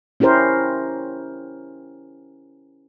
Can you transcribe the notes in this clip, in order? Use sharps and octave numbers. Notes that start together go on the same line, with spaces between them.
C#4 E4 G4 A#4 C5